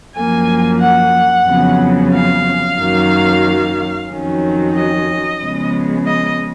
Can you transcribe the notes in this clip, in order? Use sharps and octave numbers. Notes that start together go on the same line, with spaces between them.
F#2 F3 A#3 G#5
F#5
F2 C#3 F#3 B3
F5
F#2 D#3 F#3 A#3
F2 D#3 F#3 C#4
D#5
C#3 F3 G#3 B3
D#5